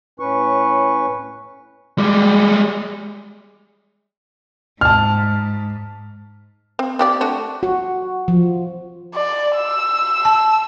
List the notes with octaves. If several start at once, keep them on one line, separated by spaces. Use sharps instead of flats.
A2 C#4 B4 C#6
G3 G#3
G#2 A5 F6
C4
C4 G4 D5
A3 D4 F#4
F#4
F3
D5
E6
A5